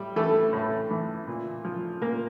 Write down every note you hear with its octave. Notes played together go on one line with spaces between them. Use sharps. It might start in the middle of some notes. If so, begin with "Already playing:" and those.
Already playing: A2 G3 G4
E3 A3 A4
A2
E3
A#2
F3
A#2 A#3 A#4